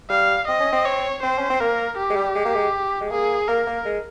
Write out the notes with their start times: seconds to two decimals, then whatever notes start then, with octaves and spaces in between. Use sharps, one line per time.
0.10 G3 F5
0.48 C4 D#5
0.60 C#4
0.73 C4
0.85 C#5
1.23 C4 C5
1.39 C#4
1.50 C4
1.60 A#3 A#4
1.98 G4
2.10 G#3
2.16 G3
2.35 G#3
2.45 A#3
2.55 G#3
3.01 G#3
3.10 A#3 G#4
3.48 A#3 A#4
3.67 A#3
3.85 G#3